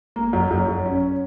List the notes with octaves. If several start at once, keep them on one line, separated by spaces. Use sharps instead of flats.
A#3
F#2
F#2
F#2
C#4